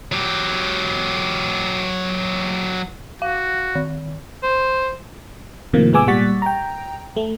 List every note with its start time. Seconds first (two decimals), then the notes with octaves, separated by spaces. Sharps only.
0.12 F#3 G4
3.22 F#4 F5
3.75 D#3
4.43 C5
5.73 A2 C3 D#3 F3 A#3
5.93 G#2 G#3 B3 G#5 D6 E6
6.07 A#2 G3 F#5 C#6 A6 B6
6.42 G5 A#5
7.17 A3